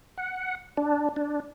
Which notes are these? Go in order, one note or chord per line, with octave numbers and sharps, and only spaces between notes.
F#5
D4
D4